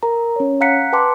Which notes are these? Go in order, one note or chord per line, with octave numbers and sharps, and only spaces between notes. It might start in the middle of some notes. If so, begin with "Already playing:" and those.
A#4 A#5
C#4 C#5
F5 F#5 A#5 F#6 B6 C#7
B4 G5 A5 C6 D6